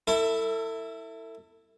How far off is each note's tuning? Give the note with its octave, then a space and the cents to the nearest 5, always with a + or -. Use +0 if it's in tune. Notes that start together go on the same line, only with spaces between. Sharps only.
E4 +0 A4 +35